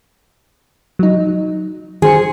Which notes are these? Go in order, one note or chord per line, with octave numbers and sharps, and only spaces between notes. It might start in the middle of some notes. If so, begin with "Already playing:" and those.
F#3 D#4
D#3 G#4 C5 C#7